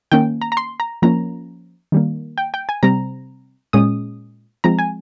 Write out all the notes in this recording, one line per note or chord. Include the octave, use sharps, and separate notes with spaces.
D#3 A#3 C#4 G5
A#5
A#5
C6
A#5
F3 A#3 C#4 A#5
D#3 G3 A#3
G5
G5
G#5
C3 G3 C4 A#5
A#2 G#3 C#4 D#6
F3 G#3 C4 A#5
G#5